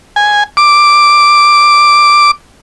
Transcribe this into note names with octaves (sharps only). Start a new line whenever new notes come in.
G#5
D6